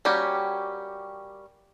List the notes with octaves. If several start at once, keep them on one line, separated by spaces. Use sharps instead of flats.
G3 A#3 C#4 F#4 G4